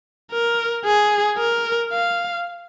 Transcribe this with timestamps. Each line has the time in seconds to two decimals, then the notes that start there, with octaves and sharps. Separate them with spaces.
0.32 A#4
0.85 G#4
1.38 A#4
1.92 F5